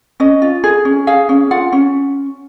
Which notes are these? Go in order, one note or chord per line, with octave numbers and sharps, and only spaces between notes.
C#4 D#5
F4
G#4
C#4
G#4 F5
C#4
F4 F#5
C#4